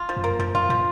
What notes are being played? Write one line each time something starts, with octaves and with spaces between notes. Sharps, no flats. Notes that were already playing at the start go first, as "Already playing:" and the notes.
Already playing: F4
F3
F#2
A#3
F#2 F3
F#2 F4
A#2 F3